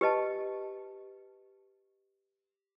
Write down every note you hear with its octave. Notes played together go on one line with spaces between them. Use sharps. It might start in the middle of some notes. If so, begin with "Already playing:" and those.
G4 B4 D#5 A5